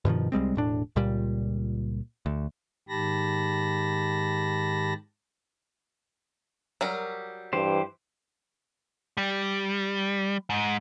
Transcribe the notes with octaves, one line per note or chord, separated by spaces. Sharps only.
G2 B2 D#3 F3
C2 G3 G#3 C4
E1 A2 D4
C#2 A#2 G3
D2
G#2 D#3 G4 A5 B5 A#6
F#3 G3 A#4
G2 E3 G4 C5
G3
G#2